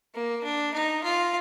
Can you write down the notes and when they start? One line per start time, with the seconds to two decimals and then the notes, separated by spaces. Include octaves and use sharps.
0.14 A#3
0.43 D4
0.74 D#4
1.03 F4